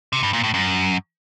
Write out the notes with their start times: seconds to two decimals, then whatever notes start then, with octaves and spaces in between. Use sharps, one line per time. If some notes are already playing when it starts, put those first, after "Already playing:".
0.13 C3
0.23 G2
0.33 A#2
0.44 A2
0.54 F#2